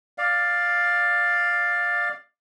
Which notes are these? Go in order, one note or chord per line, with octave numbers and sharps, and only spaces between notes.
D5 F5